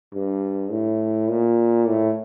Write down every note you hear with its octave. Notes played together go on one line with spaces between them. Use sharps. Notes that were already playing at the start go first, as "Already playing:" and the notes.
G2
A2
A#2
A2